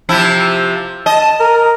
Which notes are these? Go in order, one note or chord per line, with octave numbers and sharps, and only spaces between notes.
C3 F3 E4
D#5 A5
A#4